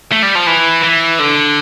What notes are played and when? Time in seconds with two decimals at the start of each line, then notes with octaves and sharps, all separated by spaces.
0.12 A3
0.23 G3
0.35 F3
0.47 E3
0.83 E3
1.20 D3